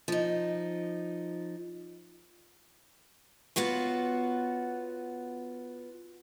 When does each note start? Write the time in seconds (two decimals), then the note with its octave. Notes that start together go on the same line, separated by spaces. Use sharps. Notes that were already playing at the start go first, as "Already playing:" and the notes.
0.08 F3 D#4
3.56 B3 F4 F#4 C#5